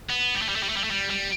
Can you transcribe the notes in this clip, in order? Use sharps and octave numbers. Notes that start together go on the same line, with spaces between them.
B3
G3
A3
G3
A3
G3
A3
G3
A3
G3
G3